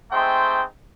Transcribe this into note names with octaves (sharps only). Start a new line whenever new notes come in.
G#3 A3 C4 D#4 C5 G5